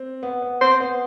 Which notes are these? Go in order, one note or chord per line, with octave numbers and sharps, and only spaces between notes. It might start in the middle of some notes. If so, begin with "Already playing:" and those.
Already playing: C4
B3
B3
C4 C5
B3